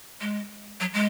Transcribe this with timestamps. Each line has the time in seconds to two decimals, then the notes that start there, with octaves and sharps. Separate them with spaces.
0.21 G#3
0.80 F#3
0.94 G#3